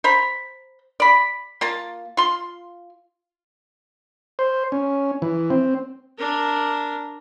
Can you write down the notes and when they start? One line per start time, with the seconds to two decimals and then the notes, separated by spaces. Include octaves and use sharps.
0.04 C5 A#5 B5
1.00 D5 B5
1.61 A#3 F4 A5
2.17 F4 C6
4.39 C5
4.72 C#4
5.22 E3
5.50 C4
6.18 D4 A#4